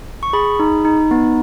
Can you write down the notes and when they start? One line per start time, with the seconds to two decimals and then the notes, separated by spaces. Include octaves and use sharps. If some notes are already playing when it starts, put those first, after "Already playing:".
0.23 C#6
0.33 G#4 B5
0.60 D#4
0.85 D#4
1.11 B3